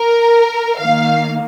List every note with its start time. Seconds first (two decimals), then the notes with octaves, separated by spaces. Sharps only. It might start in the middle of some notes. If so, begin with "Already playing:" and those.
Already playing: A#4
0.80 D#3 A#3 F5